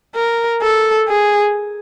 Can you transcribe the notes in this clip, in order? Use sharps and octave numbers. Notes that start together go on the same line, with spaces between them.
A#4
A4
G#4